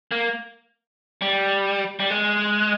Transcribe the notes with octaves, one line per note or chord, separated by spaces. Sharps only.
A#3
G3
G3
G#3